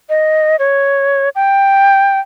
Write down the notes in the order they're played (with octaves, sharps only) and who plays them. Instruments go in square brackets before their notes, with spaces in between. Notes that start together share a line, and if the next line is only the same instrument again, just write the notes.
[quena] D#5
C#5
G5